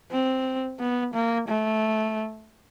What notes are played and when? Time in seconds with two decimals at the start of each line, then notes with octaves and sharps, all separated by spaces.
0.11 C4
0.80 B3
1.14 A#3
1.48 A3